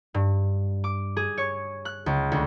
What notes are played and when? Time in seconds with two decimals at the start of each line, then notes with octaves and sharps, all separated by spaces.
0.14 G2
0.84 D6
1.17 G#4
1.38 C#5
1.85 F#6
2.06 C#2
2.32 D2